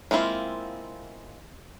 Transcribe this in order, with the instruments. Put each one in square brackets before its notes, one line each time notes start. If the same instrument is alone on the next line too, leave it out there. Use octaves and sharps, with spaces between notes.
[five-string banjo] G#3 A#3 C4 E4 F4